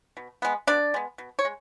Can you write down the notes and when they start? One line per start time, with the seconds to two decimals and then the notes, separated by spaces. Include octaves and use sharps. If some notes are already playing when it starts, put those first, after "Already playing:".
0.17 B2
0.42 G#3 B3
0.67 B2 D4 D5
0.94 G#3 B3
1.18 B2
1.39 C#5
1.45 G#3